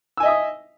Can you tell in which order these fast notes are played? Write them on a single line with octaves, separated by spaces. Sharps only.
E6 G#5 D#5 E5 D#6